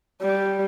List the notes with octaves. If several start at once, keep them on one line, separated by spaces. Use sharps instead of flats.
G3